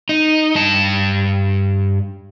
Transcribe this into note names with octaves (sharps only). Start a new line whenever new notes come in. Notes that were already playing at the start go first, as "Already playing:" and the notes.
D#4
G2 A5